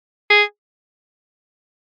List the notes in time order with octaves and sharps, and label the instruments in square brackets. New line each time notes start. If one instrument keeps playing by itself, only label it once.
[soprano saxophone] G#4